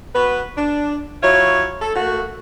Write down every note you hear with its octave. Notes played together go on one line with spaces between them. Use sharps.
B3 F#4 B4
D4
F#3 E4 F4 C#5
A4
A3 A#3 F#4